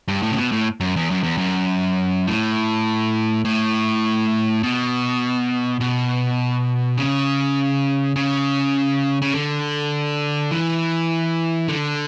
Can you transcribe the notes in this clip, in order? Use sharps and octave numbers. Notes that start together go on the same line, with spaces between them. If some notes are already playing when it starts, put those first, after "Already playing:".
G2
A2
C#3
B2
A2
F#2
E2
F#2
E2
F#2
A2
A2
B2
B2
C#3
C#3
C#3
D3
E3
D3